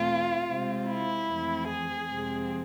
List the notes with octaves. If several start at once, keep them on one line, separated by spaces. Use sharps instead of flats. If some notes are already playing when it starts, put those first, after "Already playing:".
Already playing: E2 B2 A3 C4 F4
C3 G#3 C4
E4
F2 E3 A3 C4
G#4
F2 C3 F3 G#3 C4